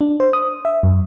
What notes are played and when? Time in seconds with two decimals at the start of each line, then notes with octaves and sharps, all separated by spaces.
0.01 D4
0.20 C5
0.33 D#6
0.65 E5
0.83 F#2